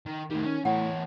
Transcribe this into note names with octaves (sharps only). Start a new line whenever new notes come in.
D#3
A2 D#3 G3
C#4
E2 A2 C#5 F#5